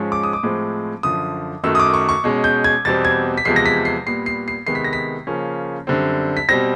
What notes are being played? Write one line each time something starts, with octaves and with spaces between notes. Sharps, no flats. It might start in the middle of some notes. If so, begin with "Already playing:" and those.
Already playing: G#2 F3 G#3 C#4
D6
D#6
D6
A2 F3 G#3 C4
F#2 D3 F3 D#6
F#2 D#3 F#3 A3 E6
D#6
D6
C#6
C#6
B2 G#3 C#4
G6
G#6
E2 B2 G3 C4 A6
G#6
B6
E2 C3 F3 G#3 C7
A#6
B6
C7
A#2 G3 B3 C7
C7
C7
C3 D#3 G#3 B3 C7
B6
A#6
B6
C#3 F3 A#3 C#4
F#2 D3 G3 C4
B6
B2 G3 C4 A#6